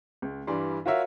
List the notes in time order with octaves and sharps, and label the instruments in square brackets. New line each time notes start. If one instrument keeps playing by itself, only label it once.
[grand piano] C#2
G2 E3 G3 D5 C6
F4 F#4 A#4 C#5 E5 F5